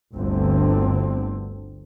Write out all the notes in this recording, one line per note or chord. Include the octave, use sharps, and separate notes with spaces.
G1 D2 D3 C4